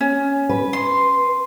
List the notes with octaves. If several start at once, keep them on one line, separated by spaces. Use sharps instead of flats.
C#4
B4
C6